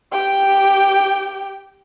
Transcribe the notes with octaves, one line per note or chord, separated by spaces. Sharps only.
G4 G5